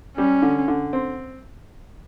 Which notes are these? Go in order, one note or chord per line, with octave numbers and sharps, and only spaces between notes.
G3 C#4
D3
D3
C4